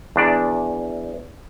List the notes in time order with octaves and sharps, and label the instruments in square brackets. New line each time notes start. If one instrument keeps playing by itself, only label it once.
[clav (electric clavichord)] E2 D4 D5